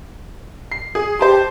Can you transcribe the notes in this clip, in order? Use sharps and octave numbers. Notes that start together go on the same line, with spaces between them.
C7
G#4
G4 C5 A5 C6